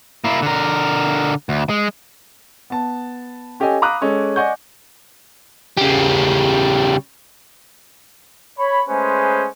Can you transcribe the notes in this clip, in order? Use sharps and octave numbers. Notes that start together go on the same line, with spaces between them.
A#3 E4
D3 A#4
D2
G#3
B3 A5
C#4 G4 A4 D#5 G#5
F5 A#5 B5 D6 D#6 F#6
G#3 C#4 A4
D5 D#5 F#5 G#5 C#6 G6
C#3 G3
C#5 B5
G#3 A3 C#4 G#4 B4 C5